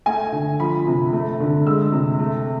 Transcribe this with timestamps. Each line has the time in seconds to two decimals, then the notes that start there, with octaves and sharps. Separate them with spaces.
0.06 A3 G#5
0.32 D3
0.60 F3 B5
0.87 C3
1.13 A3
1.40 D3
1.66 G#3 E6
1.92 C3
2.19 A3